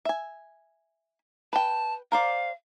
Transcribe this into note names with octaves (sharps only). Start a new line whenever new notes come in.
E5 G#5
B4 G5 A5
A#4 C5 D5 F5